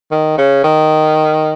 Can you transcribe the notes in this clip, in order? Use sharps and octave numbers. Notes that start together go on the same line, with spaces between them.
D#3
C#3
D#3